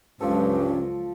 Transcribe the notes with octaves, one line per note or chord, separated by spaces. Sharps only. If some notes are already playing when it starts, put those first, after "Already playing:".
C#2 G2 F3 F#3 C#4 A4